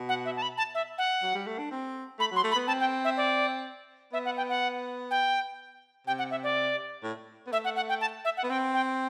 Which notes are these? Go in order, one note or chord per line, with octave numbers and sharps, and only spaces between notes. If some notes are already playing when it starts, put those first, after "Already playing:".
Already playing: B2
F#5
E5
A5
B5
A5
E5
F#5
F#3
G3
A3
D4
C4
A3 B5
F#3
C6
A3
B5
B3
C4 A5
G5
E5
D5
B3 E5
F#5
G5
F#5
G5
C3 G5
F#5
E5
D5
A2
B3
A3 E5
F#5
F#5
G5
A5
E5
F#5
B3
C4 G5
G5